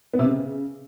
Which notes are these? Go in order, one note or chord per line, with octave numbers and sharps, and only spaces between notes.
B3
C3
C#3